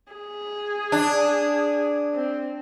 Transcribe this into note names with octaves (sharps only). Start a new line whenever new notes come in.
G#4
D4
C4